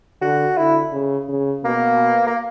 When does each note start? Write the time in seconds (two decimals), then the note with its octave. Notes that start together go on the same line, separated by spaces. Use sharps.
0.21 D3 F#4
0.57 D3 E4
0.92 C#3
1.29 C#3
1.64 B2 A#3
2.27 A#3